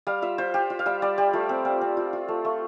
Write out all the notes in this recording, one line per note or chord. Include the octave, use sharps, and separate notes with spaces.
G3 F5
F4 E5
F4 C5
F4 G4
F4
F5
G3 E5
G3 D5
G3 G4
A3 F4
C4
C4
C4
F4
F4
A3
A3